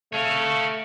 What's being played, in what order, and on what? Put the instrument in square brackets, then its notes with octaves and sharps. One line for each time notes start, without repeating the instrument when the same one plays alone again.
[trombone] A3 [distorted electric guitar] C#5 F5